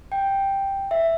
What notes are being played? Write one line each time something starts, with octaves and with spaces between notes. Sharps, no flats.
G5
E5